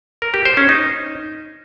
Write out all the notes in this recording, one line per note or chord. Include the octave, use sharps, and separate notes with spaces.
A#4
G4
C5
C#4
D#4